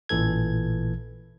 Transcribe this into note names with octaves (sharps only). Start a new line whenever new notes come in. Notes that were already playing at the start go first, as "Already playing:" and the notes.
A1 A#2 E3 A4 G#6